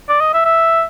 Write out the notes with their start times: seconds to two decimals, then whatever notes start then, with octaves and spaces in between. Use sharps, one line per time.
0.09 D5
0.21 D#5
0.34 E5
0.45 E5